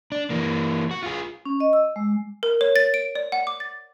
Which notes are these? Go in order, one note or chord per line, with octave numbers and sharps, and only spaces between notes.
D4
E3 A#3
F#4
F4 G#4
C#4
D#5
E6
G#3
A#4
C#5
A6
D7
D5
F#5
D6
A6